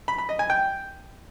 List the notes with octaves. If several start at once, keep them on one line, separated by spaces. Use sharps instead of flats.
B5
B5
D#5
G#5
G5